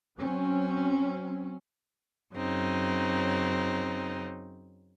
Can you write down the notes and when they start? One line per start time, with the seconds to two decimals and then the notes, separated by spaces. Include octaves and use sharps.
0.19 F#3 C4 C#4
2.34 F#2 C#3 C4 D#4